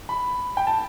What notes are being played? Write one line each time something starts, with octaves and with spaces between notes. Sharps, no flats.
B5
G5
A5